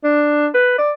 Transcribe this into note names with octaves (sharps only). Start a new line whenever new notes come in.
D4
B4
D5